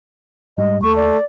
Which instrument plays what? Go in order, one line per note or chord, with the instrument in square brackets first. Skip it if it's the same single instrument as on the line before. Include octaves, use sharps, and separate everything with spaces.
[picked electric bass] G#2 G3 G#3 [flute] D#5
[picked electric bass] D#2 [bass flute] A3 [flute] C#6
[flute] D5